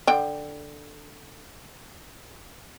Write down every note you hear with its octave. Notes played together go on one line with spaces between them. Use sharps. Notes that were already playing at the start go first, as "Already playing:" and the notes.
D3 G5